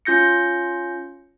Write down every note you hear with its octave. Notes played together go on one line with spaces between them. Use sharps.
C#4 F4 G6 A#6 C#7